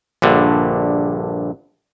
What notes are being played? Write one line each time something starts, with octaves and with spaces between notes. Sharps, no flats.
A#1 G2 D3